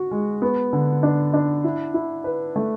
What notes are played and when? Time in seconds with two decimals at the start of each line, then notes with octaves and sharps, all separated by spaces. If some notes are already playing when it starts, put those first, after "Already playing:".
Already playing: F#4
0.11 G#3
0.42 B3
0.73 D3
1.03 D4
1.34 D4
1.64 E4
1.94 E4
2.24 B4
2.56 A3